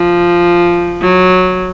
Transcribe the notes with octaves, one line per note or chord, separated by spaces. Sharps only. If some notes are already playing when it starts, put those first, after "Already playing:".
Already playing: F3
F#3